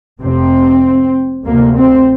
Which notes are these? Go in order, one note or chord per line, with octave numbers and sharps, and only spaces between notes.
F1 F2 C3 C4
D2 C3 A#3
C4